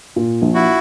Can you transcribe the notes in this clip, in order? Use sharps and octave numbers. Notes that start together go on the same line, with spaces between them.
A#2
A#1
E4 F#4